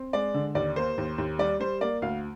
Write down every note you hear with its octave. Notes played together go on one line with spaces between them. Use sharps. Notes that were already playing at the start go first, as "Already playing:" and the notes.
Already playing: C4
G#3 D5
D3
D#2 D5
A#3 C5
D#2
D#2
G3 D5
G3 C5
A#3 D5
D2 F5